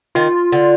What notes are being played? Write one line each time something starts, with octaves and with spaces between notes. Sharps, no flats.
D#3 F4
D3